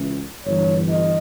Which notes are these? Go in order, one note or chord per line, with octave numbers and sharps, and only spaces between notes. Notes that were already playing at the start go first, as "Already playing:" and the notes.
Already playing: C#2 C#3 E3
G1 G2 E3 C#5
D#5